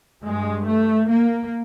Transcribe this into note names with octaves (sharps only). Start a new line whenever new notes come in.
G2 G#3
A3
A#3